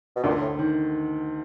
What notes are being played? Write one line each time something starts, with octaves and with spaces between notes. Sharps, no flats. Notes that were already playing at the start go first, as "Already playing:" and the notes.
B2
D2 A#2 D3
A2
D#3